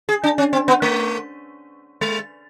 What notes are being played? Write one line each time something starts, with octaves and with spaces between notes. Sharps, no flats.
G#4
D4
C#4
C4
B3
A3
G#3